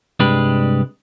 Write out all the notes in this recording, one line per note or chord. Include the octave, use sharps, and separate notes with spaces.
C2 G2 G#3 D4 G4 B4